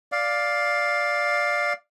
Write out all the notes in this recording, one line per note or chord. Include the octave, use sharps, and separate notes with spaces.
D5 F5